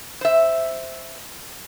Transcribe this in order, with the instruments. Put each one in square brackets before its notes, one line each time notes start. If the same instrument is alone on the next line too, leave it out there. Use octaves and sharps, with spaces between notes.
[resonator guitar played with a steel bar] C5 E5